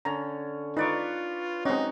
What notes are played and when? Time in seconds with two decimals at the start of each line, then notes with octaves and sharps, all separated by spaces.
0.05 D3 C#4 A#5
0.77 D#4 F4 B4 D5 C#6
1.65 G#3 C4 C#4 D#4 F#4